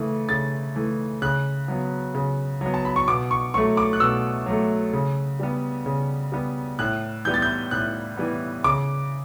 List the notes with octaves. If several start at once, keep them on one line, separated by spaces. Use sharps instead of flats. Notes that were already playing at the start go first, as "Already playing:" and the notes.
Already playing: C#3 E3 A3
C#3 A6
E3 A3
C#3 F#6
F#3 B3
C#3
F#3 B3
A5
B5
C#6
B2 D6
C#6
F#3 A3 C#6
D6
F#6
B2 E6
F#3 A3
C#3
G3 B3
C#3
G3 B3
A2 F#6
E3 G3 B3 G6
A6
G6
A2 F#6
E3 G3 B3
C#3 D6